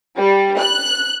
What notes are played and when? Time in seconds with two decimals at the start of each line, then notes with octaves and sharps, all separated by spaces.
0.17 G3
0.58 F#6